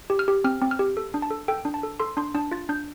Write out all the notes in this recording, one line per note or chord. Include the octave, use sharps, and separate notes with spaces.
G4
F6
G4
C4 F6
C4
F6
G4
A4
D4
A5
A4
A4 G5
D4
A5
A4
A4 C6
D4 C6
D4 A5
F4 A6
D4 G6